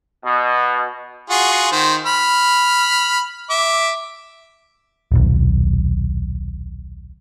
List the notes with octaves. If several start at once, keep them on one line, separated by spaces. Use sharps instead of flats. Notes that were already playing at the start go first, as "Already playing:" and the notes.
B2
F4 F#4 G#4
D#3 C5
B5 F6
E5 D6
D#1 B1